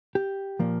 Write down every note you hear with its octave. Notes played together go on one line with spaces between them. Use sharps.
G4
A#2 F3 A#3